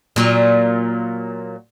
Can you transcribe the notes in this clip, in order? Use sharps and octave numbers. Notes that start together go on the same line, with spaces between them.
A#2 F#3